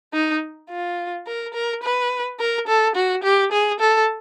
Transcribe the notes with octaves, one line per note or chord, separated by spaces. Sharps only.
D#4
F4
A#4
A#4
B4
A#4
A4
F#4
G4
G#4
A4